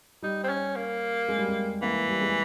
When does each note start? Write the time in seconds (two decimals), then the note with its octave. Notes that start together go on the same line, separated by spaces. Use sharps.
0.22 G3 D#4
0.43 C4
0.49 C#4
0.76 A#3
1.29 G#3
1.38 G3
1.48 G#3
1.82 E3 A#3
2.08 G3
2.21 G#3